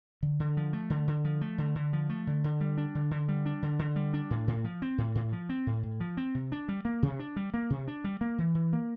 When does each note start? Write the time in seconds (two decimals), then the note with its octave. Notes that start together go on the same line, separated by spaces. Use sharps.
0.23 D3
0.40 D3
0.57 F3
0.73 A3
0.90 D3
1.08 D3
1.25 F3
1.41 A3
1.58 D3
1.75 D3
1.93 F3
2.10 A3
2.27 D3
2.44 D3
2.61 G3
2.77 D4
2.95 D3
3.11 D3
3.28 G3
3.46 D4
3.62 D3
3.79 D3
3.96 G3
4.14 D4
4.30 A2
4.48 A2
4.64 F3
4.82 C4
4.98 A2
5.15 A2
5.32 F3
5.49 C4
5.67 A2
5.83 A2
6.00 F3
6.17 C4
6.35 C3
6.52 D4
6.69 G3
6.85 A#3
7.03 C3
7.19 D4
7.36 G3
7.54 A#3
7.70 C3
7.88 D4
8.04 G3
8.21 A#3
8.38 E3
8.55 E3
8.73 A#3